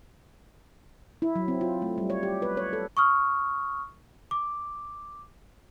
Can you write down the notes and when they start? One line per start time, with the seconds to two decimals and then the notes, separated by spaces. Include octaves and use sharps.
1.22 E4
1.35 F#3
1.48 C4
1.61 F4
1.82 A3
1.98 G3
2.10 C#5
2.23 G4
2.42 B4
2.57 C#5
2.73 A4
2.97 C#6 D#6 F6
4.31 D6